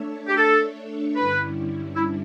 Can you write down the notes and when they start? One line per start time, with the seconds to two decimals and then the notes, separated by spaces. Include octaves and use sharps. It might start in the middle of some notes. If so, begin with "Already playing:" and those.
Already playing: A3 D4 A4 C#5 E5
0.28 G4
0.37 A4
1.16 G2 D3 G3 C#4 E4 B4
1.96 E4